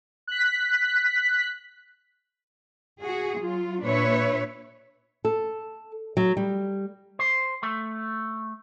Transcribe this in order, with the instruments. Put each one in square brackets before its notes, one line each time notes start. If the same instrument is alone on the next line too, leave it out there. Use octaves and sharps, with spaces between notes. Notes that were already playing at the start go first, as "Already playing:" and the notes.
[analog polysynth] F#6 B6
[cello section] F#4 G#4
F#3 F4
A#2 D4 B4 C#5 E5
[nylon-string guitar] A4
F#3
G3
[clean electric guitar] C5
A3